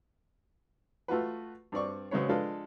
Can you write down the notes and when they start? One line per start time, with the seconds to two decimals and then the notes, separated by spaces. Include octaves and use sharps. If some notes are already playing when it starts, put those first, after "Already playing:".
1.08 A3 F4 F#4 B4
1.72 G2 C4 D5 C#6
2.11 C#3 F#3 G#3 C4 B4 C#5
2.29 F3 G#3 D4 A4 B4 F5